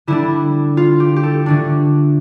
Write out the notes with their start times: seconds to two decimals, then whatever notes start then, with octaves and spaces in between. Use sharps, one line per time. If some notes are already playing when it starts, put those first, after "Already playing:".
0.07 D3 G3 D4 E4
0.77 F4
1.00 G4
1.16 G4
1.23 A4
1.46 D3 A3 D4